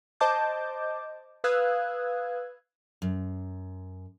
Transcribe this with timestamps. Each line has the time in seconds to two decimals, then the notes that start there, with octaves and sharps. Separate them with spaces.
0.20 C5 D#5 A5 D6 G6
1.44 B4 F5 D#6 E6 F#6 G#6
3.02 F#2